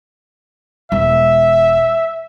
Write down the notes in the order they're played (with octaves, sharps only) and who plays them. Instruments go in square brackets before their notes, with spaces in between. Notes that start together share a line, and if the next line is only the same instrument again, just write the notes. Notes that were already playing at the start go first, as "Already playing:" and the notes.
[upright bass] E1 [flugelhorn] E5